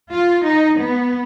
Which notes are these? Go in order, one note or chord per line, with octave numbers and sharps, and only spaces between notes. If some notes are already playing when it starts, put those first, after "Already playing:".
F4
D#4
B3